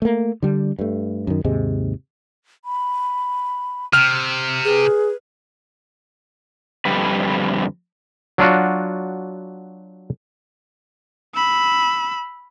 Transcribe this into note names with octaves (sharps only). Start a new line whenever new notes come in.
A3 A#3
D3 G3 D4
G2 A3
F#2 D#3
D#2 G#2 C3 G#3
B5
C3 F6
G#4 B4
F2 D3 G3 B4
F#3 D4 F4 F#4
B5 E6